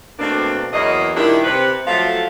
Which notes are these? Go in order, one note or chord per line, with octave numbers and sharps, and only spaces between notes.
B2 A3 A#3 C4 D4
E2 E3 F#3 A#3 D#5
A#2 D#3 G3 D4 E4
C3 B4
F3 F#3 A3 A4 E5 F5